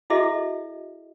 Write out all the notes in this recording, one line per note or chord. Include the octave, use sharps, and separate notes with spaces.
E4 F#4 G#4 A4 D#5 E5